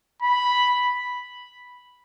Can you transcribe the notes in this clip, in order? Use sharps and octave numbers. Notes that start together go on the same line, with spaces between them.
B5